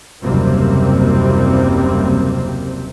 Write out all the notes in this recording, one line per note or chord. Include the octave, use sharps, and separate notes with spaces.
F#1 D#2 C3 G3 A#3 C4